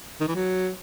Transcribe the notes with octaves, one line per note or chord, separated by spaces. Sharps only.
D#3
E3
F#3